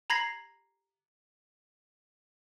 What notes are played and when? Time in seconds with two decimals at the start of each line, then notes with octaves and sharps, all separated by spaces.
0.10 A#5 B5 G#6 A#6 C7 F#7